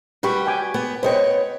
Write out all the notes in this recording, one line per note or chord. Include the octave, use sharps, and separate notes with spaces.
G3 F#4 G4 B4 B5 C#6
G5 G#5 D6
B3
B3 A#4 C5 C#5 D#5 G5